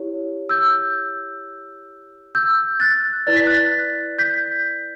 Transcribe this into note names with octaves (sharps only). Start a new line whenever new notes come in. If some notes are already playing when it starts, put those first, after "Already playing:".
Already playing: E4 G4 C#5
E6 G6
E6 G6
F#6 A6
E4 B4 D5 A6
B6
F#6 A6
G6 B6